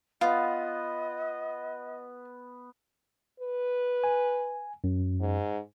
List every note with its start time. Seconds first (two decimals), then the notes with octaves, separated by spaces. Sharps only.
0.21 B3 F4 D#5
3.40 B4
4.04 G#5
4.84 F#2
5.20 G#2